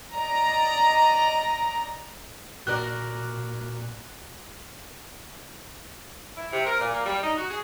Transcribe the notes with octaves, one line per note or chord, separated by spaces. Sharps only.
D5 D#5 A#5
A#2 F#4 A#4 D5 F#6
E4
C3
A#4
A#2
A#3
G3
D#4
F#4
G#4